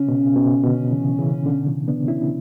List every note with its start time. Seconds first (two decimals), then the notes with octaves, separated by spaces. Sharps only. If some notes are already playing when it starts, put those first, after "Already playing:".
Already playing: C#3 C#4
0.08 B2
0.36 B2
0.64 B2 D3
0.91 C#3 E3
1.19 C#3 E3
1.46 B2 D3
1.67 C#3 E3
1.88 B3 D4
2.08 C#4 E4